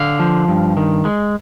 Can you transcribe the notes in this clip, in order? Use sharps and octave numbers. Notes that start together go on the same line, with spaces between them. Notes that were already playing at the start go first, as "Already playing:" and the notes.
Already playing: D3 F5
F3
G2
D#3
G#3